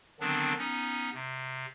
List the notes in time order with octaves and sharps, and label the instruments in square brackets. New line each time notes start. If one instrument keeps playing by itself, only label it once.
[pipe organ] D3 D#3 F#3 B3 C4 D4
B3 C#4 D#4
C3